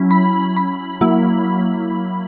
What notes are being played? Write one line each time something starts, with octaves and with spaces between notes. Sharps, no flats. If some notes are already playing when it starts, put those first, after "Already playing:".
Already playing: F#3 C#4 E4
B5
B5
F#3 A#3 E4